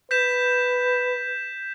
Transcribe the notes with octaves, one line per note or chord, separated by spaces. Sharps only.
B4 G6 B6 E7